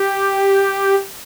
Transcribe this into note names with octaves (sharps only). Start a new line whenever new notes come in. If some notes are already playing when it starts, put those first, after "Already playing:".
Already playing: G4